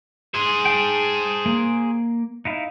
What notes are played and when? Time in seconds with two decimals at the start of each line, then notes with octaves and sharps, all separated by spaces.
0.34 G#4 C5
0.65 G5 A5
1.46 A#3
2.45 D#4 E4 F5